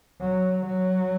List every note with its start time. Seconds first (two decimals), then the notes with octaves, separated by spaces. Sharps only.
0.21 F#3
0.66 F#3